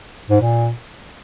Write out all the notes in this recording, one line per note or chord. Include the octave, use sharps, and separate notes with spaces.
G#2
A#2